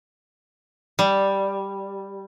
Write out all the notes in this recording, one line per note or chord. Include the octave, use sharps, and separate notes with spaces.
G3